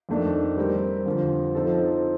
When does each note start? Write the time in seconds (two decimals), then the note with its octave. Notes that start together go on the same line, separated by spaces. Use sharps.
0.09 F2 D#3 A3 D4
0.57 G3 C4 G4 A#4
1.06 F2 D3 F3
1.55 F3 C4 D#4 A4